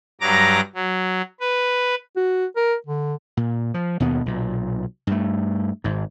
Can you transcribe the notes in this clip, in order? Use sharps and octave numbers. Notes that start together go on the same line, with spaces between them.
G2 F#3 A#5 D6 A#6
F#3
B4
F#4
A#4
D3
A#2
F3
D#2 B2 B3
B1 A#2
G2 A3
G#1 G#2